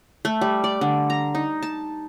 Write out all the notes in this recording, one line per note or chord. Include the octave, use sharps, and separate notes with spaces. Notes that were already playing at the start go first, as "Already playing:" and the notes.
A3
G3
D5
D3
A#5
D#4
A5